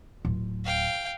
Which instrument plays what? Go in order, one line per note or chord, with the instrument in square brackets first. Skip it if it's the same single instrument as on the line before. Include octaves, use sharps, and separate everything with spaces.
[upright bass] D1 F4
[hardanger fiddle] F5 G5